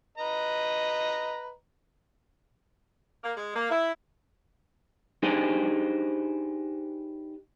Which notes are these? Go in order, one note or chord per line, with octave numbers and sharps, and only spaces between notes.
B4 D#5 A#5
A#3
G#3
A#3
E4
D4 D#4 G4 G#4 B4 C5